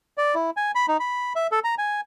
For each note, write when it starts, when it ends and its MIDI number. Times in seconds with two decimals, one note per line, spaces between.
0.18 0.35 74
0.35 0.50 64
0.57 0.71 80
0.75 0.86 83
0.88 0.97 63
1.00 1.33 83
1.36 1.47 76
1.52 1.59 69
1.64 1.75 82
1.78 2.01 80